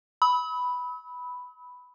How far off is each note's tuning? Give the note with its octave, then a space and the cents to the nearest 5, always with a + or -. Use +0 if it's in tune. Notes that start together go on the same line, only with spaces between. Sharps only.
B5 +0 E6 -45